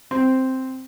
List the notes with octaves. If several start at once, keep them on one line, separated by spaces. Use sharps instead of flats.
C4